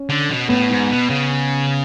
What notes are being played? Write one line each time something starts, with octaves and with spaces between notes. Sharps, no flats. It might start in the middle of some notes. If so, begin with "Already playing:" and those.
Already playing: C#4
D3
B2
A2 B3
G#2
B2
C#3